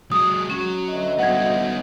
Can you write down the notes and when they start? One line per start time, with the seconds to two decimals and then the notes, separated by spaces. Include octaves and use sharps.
0.12 F#3 G#3 D#6
0.50 F#3 C#4
0.89 D2 F#4 D#5
1.19 D#3 G3 B3 D#4 F#5 G#6